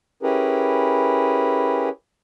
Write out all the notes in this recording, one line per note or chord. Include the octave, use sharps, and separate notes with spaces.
C#4 E4 G4 G#4 A#4 B4